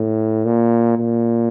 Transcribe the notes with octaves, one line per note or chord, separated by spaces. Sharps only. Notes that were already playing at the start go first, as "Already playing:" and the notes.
Already playing: A2
A#2
A#2